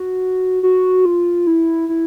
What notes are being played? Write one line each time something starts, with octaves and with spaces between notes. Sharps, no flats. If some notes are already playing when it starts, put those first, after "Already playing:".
Already playing: F#4
F#4
F4
E4
E4